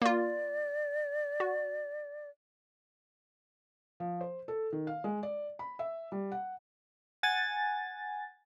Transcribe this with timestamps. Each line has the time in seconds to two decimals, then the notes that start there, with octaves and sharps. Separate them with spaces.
0.02 A#3 F4 D5
1.40 F#4
4.00 F3
4.21 C5
4.48 A4
4.72 D#3
4.87 F5
5.04 G#3
5.23 D5
5.59 B5
5.79 E5
6.12 G3
6.32 F#5
7.23 F#5 G#5 A6